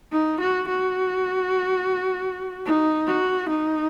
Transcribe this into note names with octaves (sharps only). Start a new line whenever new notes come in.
D#4
F#4
F#4
D#4
F#4
D#4